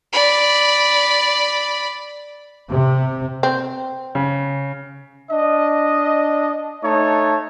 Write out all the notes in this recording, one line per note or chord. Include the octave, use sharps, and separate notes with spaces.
D5 B5
C3
C4
C#3
D4 D#5
A3 D#4 C#5 A5